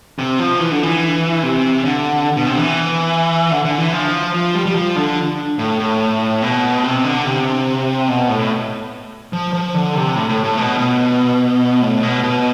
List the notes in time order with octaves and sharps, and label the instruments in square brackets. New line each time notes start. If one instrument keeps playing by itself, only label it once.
[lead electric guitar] C3
F3
E3
D3
E3
C3
D3
B2
C3
E3
D3
D3
E3
F3
F3
G3
G3
F3
D3
A2
A2
B2
C3
D3
C3
B2
A2
F3
F3
D3
C3
A2
A2
A2
B2
B2
A2
B2
B2